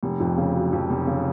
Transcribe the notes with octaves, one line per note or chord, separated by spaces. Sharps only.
F1
F2
C#3
F#3
F2
F1
C#3